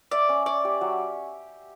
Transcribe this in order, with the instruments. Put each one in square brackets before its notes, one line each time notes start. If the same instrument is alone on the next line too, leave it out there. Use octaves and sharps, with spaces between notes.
[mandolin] D5 [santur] E5
[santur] C#4
[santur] C#5 [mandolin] D5
[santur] G4
F#3